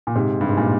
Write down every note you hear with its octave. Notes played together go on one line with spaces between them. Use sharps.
A#2
G#2 C3
G2
G#2
A#2